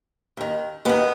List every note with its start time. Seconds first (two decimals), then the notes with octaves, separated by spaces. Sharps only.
0.37 D#2 D#3
0.85 D#2 D#3 B3